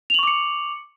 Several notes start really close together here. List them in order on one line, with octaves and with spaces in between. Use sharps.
F7 F#7 C#6 D6 C#7